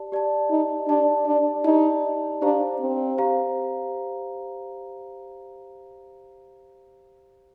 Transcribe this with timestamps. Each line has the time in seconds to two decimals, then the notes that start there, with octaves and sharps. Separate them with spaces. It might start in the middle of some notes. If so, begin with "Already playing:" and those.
Already playing: G4 D5 A5
0.12 G4 D5 A5
0.51 D#4
0.88 D4 G4 D5 A5
1.26 D4
1.65 D#4 G4 D5 A5
2.42 D4 G4 C5 F5 A#5
2.80 C4
3.18 G4 C5 F5 A#5